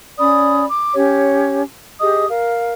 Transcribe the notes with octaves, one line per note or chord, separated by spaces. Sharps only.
C#4 D5 B5 D#6
D6
C#4 G4 C#5
G4 G#4 D#5 D#6
A#4 F5